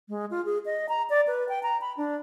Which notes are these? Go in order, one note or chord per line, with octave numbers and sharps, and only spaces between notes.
G#3
F4
G#4
D#5
A#5
D5
B4
G5
A#5
B5
D4